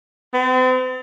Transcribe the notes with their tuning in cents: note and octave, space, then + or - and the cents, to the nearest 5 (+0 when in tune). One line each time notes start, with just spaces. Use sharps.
C4 -40